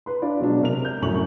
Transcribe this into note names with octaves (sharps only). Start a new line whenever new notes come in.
B4 C6
D4 F4 D5
B2 F#3 G#3 D4
C3 A#4 F7
G6
C2 F#2 A2 F#3 C#6 F#7